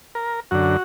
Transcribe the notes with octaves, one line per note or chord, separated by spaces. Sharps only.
A#4
F#2 D3 F#4